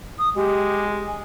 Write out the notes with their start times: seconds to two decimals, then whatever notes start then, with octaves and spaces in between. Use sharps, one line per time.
0.19 D#6
0.36 G#3 G4
1.08 G#5